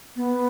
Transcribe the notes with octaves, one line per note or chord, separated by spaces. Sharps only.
B3